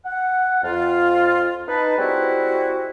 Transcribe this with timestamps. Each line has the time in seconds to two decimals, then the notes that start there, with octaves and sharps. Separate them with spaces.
0.05 F#5
0.63 F2 F4
1.68 D#4 B4 A5
1.98 G3 G#3 C4 E4 F#4